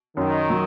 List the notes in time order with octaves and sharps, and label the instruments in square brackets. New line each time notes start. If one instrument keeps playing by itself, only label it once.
[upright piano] F#2 [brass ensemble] D#3
[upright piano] F#3